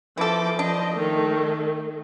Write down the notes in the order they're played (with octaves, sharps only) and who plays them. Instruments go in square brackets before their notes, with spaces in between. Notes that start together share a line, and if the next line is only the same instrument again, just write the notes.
[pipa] E3 A4 [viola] F3 D6
[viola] F3 D#5 [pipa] D4
[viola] D#3 A3